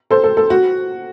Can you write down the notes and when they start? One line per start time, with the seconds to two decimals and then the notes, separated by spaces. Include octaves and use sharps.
0.11 A4 C5
0.24 A4
0.37 A4
0.50 F#4